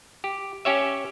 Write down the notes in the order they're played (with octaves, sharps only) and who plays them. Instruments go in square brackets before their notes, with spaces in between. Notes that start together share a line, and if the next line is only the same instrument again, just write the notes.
[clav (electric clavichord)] G4
C#4 G4 C#5 E5